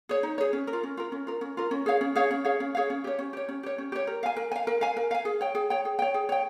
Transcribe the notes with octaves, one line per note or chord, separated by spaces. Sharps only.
G#4 C#5
D#4
G#4 C#5
C#4
A#4
F4
C#4
F4 A#4
C#4
F4 A#4
C#4
F4 A#4
C#4
G#4 C#5 F5
C#4
G#4 C#5 F5
C#4
G#4 C#5 F5
C#4
G#4 C#5 F5
C#4
G4 C#5
C#4
G4 C#5
C#4
G4 C#5
C#4
G4 C#5
A#4
F5 G#5
A#4
G#5
F5
A#4
F5 G#5
A#4
F5 G#5
G#4
C#5 G5
G#4
C#5 G5
G#4
C#5 G5
G#4
C#5 G5